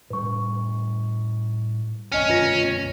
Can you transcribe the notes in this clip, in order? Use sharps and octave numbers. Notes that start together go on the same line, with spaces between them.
A2 G3 B4 C#6
B1 F#2 D3 C#4 D#5 F6
F4 B4 A#6